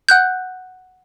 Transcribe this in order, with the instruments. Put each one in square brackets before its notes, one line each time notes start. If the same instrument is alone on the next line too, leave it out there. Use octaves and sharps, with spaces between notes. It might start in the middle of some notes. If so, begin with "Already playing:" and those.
[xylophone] F#5 F#6 G6